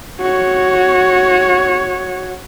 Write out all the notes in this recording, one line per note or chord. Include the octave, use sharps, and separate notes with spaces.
F#4 C#5